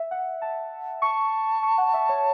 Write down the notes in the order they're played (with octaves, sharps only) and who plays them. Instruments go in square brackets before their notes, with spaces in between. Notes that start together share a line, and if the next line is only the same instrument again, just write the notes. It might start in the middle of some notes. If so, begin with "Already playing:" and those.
Already playing: [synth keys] E5
F#5
A5
[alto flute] A5 [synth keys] C#6
[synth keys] C#6
F#5
E5
C#5